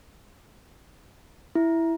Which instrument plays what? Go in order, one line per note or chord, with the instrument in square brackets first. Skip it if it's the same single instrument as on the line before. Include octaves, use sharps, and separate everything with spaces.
[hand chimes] E4